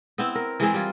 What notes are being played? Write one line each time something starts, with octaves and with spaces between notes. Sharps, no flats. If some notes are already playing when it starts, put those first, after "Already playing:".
B3 C4 E4
A#4
E3 G#3 C4 G#4
G3 F4